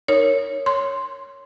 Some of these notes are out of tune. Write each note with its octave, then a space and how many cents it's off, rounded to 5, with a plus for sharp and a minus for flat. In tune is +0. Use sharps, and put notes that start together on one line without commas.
D#4 +0 A#4 -10 C#5 +0
C#5 +0 C6 +0